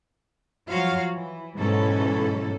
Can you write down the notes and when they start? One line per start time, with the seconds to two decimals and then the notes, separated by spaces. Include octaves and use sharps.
0.69 F3 F#3 F4 F#4 C#5 F5
1.11 E3
1.55 G#2 B2 E3 F#3 C#4 A4